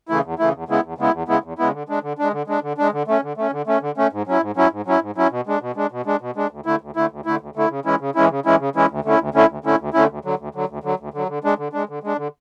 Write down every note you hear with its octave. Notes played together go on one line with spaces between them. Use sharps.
C#3 E3 A3 E4
E2
C#3 E3 A3 E4
E2
C#3 G#3 B3 E4
E2
C#3 G#3 B3 E4
E2
C#3 G#3 B3 E4
E2
C#3 G#3 B3 E4
D3
G#3 D4
D3
G#3 D4
D3
G#3 D4
D3
G#3 D4
D3
A3 C#4
D3
A3 C#4
D3
A3 C#4
D3
A3 C#4
G#2
F#3 C#4 E4
G#2
F#3 C#4 E4
G#2
F#3 C#4 E4
G#2
F#3 C#4 E4
B2
G#3 D4
B2
G#3 D4
B2
G#3 D4
B2
G#3 D4
D2
D3 A3 E4
D2
D3 A3 E4
D2
D3 A3 E4
D2
D3 A3 E4
C#3
E3 G#3 C#4 E4
C#3
E3 G#3 C#4 E4
C#3
E3 G#3 C#4 E4
C#3
E3 G#3 C#4 E4
D2
D3 A3 C#4 E4
D2
D3 A3 C#4 E4
D2
D3 A3 C#4 E4
D2
D3 A3 C#4 E4
D2
D3 F#3
D2
D3 F#3
D2
D3 F#3
D2
D3 F#3
D3
G#3 D4
D3
G#3 D4
D3
G#3 D4
D3